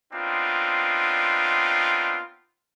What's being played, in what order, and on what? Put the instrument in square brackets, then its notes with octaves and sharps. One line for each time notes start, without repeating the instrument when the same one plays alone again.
[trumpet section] B3 C4 D4 D#4 F4